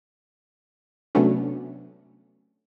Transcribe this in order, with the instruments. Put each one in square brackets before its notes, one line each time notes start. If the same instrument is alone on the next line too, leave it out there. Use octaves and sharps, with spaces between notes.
[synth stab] C3 F#3 A3 B3 C#4 D4